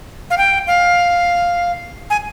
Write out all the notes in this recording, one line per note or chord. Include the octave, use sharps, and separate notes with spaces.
F5
G5
F5
G#5